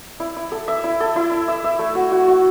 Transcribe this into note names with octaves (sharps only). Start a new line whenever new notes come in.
E4
E4
A4
E5
E4
A4
E4
E4
E5
E5
A3
F#4
F#4
F#4